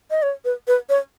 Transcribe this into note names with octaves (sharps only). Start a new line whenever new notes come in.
D#5
C#5
B4
B4
C#5